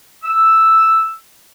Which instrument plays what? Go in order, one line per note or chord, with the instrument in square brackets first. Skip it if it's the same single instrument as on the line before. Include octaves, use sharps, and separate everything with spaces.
[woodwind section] E6